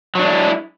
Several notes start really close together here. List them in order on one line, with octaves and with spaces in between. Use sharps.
F#3 D4 G#3 E4